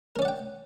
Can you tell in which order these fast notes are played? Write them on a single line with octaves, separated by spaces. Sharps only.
A#4 C#4 D5 F#5 G5